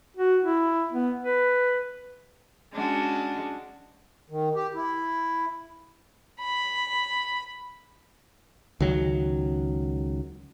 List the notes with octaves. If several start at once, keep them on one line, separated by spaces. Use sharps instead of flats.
F#4
E4
B3
B4
G#3 C#4 D4 F#4
D#3
G4
E4
B5
C#2 D#3 F#3